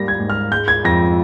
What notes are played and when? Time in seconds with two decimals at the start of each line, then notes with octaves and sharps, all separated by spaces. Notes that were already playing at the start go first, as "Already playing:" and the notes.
Already playing: G#2 G3 A#3 A#6
0.08 G#6
0.19 G#2
0.30 F6
0.51 G#3 G6
0.68 G#6
0.85 F2 A#6